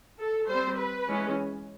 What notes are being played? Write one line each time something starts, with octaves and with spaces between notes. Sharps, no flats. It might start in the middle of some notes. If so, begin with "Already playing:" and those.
A4
G3 C5
C4
B4
E3 G#3 C#4